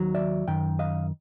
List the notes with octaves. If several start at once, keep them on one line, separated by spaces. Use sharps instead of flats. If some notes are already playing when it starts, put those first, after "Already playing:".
Already playing: D#2 D#3 F#3
D5 E5
F#2 D#3 G5
D#5 F5